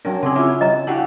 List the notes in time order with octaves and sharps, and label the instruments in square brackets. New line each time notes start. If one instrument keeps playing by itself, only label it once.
[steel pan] F#3 C#4 D4 [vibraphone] A#4 G5
[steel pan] C#3 C#4 G#4 [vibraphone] C4 D6 E6
[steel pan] E4 C#5 [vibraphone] F4
[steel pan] G3 [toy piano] D#5 A#5
[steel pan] D4 F#4 G4 [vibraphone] E4 F5